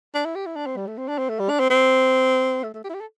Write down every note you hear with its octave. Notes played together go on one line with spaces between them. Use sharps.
D4
E4
G4
E4
D4
C4
G3
A3
C4
D4
C4
A3
G3
D4
C4
C4
A3
A3
G4
E4
G4
A4